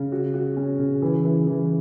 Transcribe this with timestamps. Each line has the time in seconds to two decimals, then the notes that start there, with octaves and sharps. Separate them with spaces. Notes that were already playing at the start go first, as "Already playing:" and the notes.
Already playing: C#3
0.12 F#4
0.34 F#4
0.57 C#4
0.79 C#3
1.02 E3
1.24 E3
1.47 E3